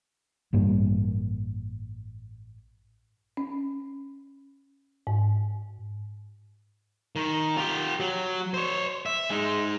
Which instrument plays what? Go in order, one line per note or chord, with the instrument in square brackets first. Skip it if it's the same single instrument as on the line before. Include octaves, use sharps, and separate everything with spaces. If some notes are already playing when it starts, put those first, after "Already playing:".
[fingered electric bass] A1 G2 G3 A#3
[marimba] C#4
G#2
[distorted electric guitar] D#3
F4 G4
F#3
C5 C#5
E5
G#3 D#4